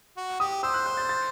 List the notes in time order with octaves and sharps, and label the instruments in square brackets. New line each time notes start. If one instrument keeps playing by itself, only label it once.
[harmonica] F#4
[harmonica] G4 [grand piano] D#6
[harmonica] C5 [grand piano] E6
[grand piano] F#6
G6
A6
A6